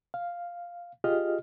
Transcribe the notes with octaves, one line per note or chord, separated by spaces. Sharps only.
F5
F4 G4 G#4 D#5 F6